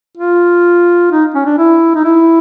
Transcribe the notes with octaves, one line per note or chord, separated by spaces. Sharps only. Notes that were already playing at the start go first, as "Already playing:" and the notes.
F4
D#4
C#4
D4
E4
D#4
E4